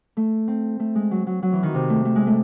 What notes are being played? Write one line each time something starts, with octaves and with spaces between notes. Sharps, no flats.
A3
C4
A3
G#3
F#3
F#3
F#3
E3
D#3
C3
A3
A3
G#3
A3